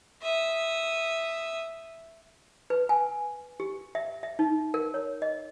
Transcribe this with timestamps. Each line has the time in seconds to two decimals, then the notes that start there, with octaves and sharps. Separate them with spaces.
0.22 E5 D#6
2.70 B4
2.89 G#5
3.60 G4
3.95 E5
4.23 E5
4.39 D#4
4.74 A#4
4.94 C#5
5.22 D#5